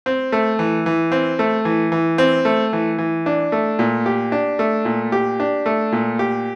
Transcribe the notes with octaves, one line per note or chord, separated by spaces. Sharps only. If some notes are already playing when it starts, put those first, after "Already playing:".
C4
A3
E3
E3
C4
A3
E3
E3
C4
A3
E3
E3
D4
A3
A#2
G4
D4
A3
A#2
G4
D4
A3
A#2
G4